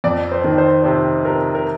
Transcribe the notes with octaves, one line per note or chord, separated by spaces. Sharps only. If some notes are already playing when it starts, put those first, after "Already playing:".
F2 D5
C5
D#3
C5
C3 C5
C3 A#4
A#4